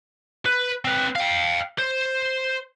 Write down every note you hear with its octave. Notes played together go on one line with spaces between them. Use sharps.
B4
C4 B4
F5 G5
C5